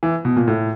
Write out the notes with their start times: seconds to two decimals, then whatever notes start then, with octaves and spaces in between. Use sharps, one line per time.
0.03 E3
0.25 B2
0.36 A#2
0.48 A2